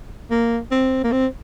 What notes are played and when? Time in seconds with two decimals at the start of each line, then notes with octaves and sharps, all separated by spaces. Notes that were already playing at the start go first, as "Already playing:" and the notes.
0.31 A#3
0.71 C4
1.04 A#3
1.12 C4